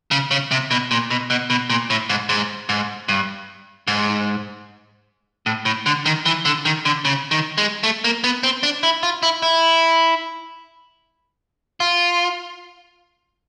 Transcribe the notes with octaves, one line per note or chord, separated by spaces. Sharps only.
C#3
C#3
C3
B2
A#2
B2
B2
B2
A#2
A2
G#2
G#2
G#2
G2
G#2
A2
A2
D3
D#3
E3
D3
D#3
D3
C#3
D#3
G#3
A3
A#3
B3
C4
D4
E4
F4
E4
E4
F4